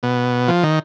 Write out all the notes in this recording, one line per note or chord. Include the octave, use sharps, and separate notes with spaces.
B2
F3
D#3